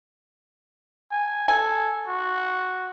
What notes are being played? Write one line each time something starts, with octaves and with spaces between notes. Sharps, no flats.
G#5
A4 G#5
F#4